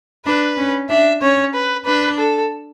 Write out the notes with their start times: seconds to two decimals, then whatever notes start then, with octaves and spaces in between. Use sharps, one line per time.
0.26 D4 B4
0.58 C#4
0.90 D4 E5
1.21 C#4 C#5
1.54 B4
1.86 D4 B4
2.18 A4